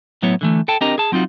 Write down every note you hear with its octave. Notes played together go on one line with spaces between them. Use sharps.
A2 F#3 B3 E4 C#5
D3 E3 A3
A4 G5 A5
C4 D4 G4 A#4 D#5 A#5
G#4 A5
F#3 C4 D#4 F4 F#4